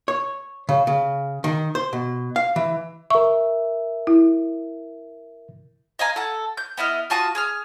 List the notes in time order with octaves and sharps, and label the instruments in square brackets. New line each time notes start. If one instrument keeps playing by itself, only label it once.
[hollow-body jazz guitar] C#5
C#3
C#3
D#3
C5
B2
F5
E3
[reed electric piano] A#4 E5 [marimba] C#6
[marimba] E4
[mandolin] D#5 F5 G#5 A#5
A4 F#5
G6
B3 E4 D#5 F6
F4 F#4 A5 D#6
G#4 D#6 F6